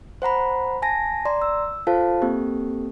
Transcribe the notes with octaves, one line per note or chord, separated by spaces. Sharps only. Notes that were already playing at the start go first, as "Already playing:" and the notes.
C5 F#5 A#5 B5
G#5 A5 A#6
D5 A#5 C6
E6
F4 A4 C5 F5 A5
A#3 C4 G4 A4